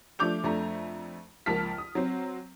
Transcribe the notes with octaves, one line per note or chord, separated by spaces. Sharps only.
F3 A3 D4 D6 G6 F7
F2 A3 D4 A#5
C#2 F3 A#3 A5 F6 B6
D#6
F#3 C4